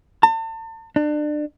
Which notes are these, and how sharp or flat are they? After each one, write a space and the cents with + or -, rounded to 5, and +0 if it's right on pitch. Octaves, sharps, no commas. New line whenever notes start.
A5 +40
D4 +30